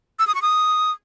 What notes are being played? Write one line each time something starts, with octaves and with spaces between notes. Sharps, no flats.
E6
D#6
C#6
D#6